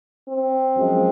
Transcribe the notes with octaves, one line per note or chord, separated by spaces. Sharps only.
C4
F#2 F3 G#3